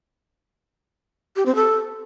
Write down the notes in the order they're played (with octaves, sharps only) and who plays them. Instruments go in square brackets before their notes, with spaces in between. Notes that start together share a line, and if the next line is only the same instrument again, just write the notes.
[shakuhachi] G4
C4
A4